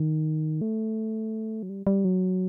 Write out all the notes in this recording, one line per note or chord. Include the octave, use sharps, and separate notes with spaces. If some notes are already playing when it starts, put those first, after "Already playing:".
Already playing: D#3
A3
F#3
G3
G3
F#3